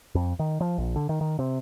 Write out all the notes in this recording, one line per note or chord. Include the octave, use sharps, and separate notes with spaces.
F2
D#3
F3
A#1
D3
D#3
D#3
C3